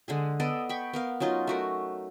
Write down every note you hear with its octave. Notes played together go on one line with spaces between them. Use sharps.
D3 G#3 G#4
B3 A4 D5 D#5
G5 B5 C#6
B3 A#4 F5
F#3 C#4 D#4 F4
A3 F#4 A#4